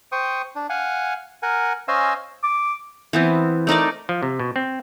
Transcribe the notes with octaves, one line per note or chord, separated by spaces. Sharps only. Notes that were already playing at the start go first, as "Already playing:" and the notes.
C5 G5 C#6 D#6
D4
F5 F#5 G#5
A#4 F#5 G#5
C#4 C5 D#5 F5 G#5 E6
D6
E3 B3 C4
A3 D#4 A#4 D5
F3
C3
B2
C4